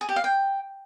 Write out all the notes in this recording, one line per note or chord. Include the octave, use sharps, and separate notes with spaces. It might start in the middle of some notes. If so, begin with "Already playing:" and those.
G#4
G4
F5
G5